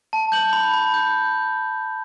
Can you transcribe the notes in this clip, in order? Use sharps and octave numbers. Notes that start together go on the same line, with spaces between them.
A5
G6 F#7
B5
B5
G6